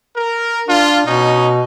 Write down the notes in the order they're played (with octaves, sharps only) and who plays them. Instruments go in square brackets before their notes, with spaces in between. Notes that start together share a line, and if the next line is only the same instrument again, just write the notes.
[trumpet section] A#4
[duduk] D4 [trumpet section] F4
[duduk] B2 [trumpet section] C#4 D#4